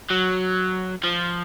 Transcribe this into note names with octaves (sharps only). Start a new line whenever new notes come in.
F#3
F3